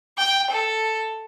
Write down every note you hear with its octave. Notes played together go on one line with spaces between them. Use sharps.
G5
A4